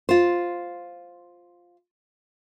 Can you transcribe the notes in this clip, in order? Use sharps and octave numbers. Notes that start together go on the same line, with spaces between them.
F4 C5